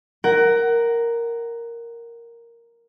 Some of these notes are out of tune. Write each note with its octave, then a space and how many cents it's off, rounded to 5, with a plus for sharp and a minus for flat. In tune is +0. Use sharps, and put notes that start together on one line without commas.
A#4 +0 F#5 +20